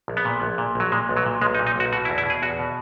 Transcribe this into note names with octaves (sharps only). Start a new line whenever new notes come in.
A#1
B3
A#2
A#1
A#2
A#1 F#3
A#2 G#3
B1
F#3
A#2
B1 G#3
D#4
A#2
D#4
B1 F#4
B2 F#4
E4
E2
E4
B2 G#4
E2 F#4
B2